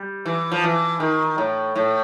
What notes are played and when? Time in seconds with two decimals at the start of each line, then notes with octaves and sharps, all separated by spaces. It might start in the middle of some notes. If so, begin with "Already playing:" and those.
Already playing: G3
0.26 E3
0.52 F3
0.64 E3
1.00 D#3
1.38 A2
1.76 A2